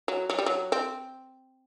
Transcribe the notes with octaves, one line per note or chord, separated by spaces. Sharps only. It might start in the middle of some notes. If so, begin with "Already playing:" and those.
F#3
F#3
G3
F#3
C4